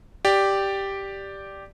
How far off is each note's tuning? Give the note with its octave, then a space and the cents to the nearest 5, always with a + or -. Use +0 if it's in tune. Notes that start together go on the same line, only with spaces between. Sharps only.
G4 +0 D5 +0